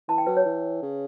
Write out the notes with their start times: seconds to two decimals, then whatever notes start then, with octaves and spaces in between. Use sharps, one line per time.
0.08 E3 A5
0.18 G5
0.27 F#3 B4
0.37 C#5
0.45 E3
0.82 C#3